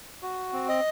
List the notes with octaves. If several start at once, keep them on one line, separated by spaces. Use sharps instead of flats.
F#4
C4
D#5